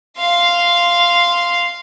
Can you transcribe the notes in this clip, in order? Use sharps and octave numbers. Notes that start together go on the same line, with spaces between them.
F5 C6